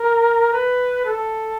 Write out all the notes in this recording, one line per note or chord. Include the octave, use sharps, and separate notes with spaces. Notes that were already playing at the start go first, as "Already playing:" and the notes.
Already playing: A#4
B4
A4